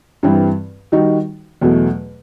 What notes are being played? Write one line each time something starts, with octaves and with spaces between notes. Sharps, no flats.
G2 E3 G3 C4
D#3 G3 D#4 F#4
E2 B2 F#3 A3